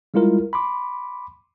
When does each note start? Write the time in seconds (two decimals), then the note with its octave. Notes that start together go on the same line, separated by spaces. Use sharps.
0.14 G3 G#3 E4 F4 A#4
0.53 B5 C6 D6